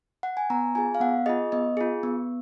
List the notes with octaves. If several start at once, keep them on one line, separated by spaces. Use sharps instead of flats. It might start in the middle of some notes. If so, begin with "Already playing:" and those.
F#5
G#5
B3 A#5
F4 G#4 G#5
F5
B3 F#5
F4 G#4 D#5
B3 D#5
F4 G#4
B3